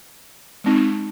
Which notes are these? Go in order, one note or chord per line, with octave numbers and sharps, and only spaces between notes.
G#3 C4 D#4